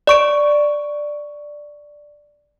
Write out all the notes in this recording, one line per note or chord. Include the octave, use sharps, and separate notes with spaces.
D5 C#6 D7